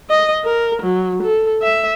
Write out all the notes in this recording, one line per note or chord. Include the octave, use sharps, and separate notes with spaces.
D#5
A#4
F#3
A4
E5